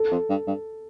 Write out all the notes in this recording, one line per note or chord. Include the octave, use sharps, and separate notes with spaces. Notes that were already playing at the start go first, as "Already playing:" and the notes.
Already playing: A4
F2
G2
G2